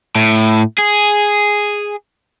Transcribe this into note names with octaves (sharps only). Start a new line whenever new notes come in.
A2
G#4